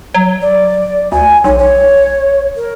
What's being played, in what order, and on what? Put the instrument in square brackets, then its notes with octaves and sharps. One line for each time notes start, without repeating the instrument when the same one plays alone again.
[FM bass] F#3
[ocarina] D5
[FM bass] D2 [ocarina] G#5
[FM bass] B1 [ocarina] C#5
[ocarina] C#5
A#4